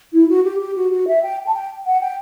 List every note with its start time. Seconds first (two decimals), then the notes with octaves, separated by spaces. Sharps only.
0.13 E4
0.29 F#4
0.44 G4
0.60 G4
0.76 F#4
0.91 F#4
1.08 E5
1.23 G5
1.47 A5
1.54 G5
1.86 F#5
2.01 G5